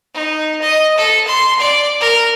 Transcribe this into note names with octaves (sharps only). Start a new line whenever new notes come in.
D#4
D#5
A4
C6
D5
A#4